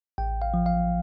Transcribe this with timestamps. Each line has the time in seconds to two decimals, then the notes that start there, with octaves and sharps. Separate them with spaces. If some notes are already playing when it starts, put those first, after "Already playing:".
0.18 A1 G5
0.42 F5
0.54 F3
0.66 F5